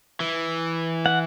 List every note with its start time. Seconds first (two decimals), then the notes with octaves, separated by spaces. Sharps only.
0.20 E3
1.06 F#5